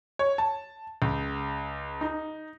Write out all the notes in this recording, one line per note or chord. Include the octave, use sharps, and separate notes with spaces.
C#5
A5
C#2
D#4